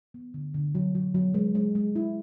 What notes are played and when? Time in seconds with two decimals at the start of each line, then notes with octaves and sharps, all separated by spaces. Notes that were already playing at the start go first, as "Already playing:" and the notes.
0.14 B3
0.34 D3
0.54 D3
0.75 F#3
0.95 F#3
1.15 F#3
1.34 G#3
1.55 G#3
1.75 G#3
1.96 E4